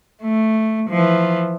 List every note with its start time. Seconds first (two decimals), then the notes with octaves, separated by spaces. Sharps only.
0.22 A3
0.90 E3 F3